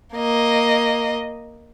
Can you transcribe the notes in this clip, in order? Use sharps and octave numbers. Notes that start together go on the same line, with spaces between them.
A#3 D#5